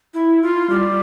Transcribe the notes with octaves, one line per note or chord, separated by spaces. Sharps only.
E4
F4
G3